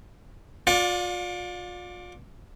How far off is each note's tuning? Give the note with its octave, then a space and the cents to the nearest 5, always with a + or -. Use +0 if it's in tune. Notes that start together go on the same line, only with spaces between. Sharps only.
F4 +35 D5 +0 F#5 -40